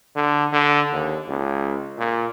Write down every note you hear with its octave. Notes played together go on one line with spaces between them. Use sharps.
D3
D3
D#2
C#2
A#2